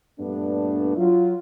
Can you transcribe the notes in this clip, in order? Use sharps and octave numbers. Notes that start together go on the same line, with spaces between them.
G2 A#2 A3 B3 D4
F#3 F4